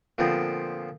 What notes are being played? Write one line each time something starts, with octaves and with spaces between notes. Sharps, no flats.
A#2 D3 F3 B3 C4